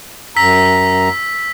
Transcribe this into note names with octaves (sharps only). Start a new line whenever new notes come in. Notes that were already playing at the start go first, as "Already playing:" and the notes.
F#2 A#5 E6 B6